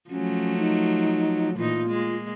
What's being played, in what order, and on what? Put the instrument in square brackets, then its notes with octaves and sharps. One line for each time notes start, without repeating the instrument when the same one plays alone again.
[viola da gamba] F3 F#3 A3 [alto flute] C#4
[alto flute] D#4
[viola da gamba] A#2 E3 D#4 [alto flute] F4
[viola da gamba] G#3 A#3